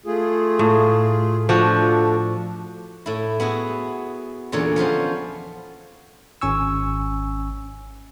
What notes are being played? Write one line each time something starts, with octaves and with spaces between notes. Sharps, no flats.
A3 F4 G#4
A2
F3 A3 D4 F#4
A2 E4
B3 E4 F#4 G#4
E2 A#2 D3 C#4 C#5
F3 B3 C#4 C5
G#1 C#4 G#5 C#6 E6